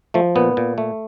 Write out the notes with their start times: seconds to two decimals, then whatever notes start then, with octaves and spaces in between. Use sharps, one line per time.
0.14 F3 A3
0.36 A#2 B3
0.57 A#2
0.78 A3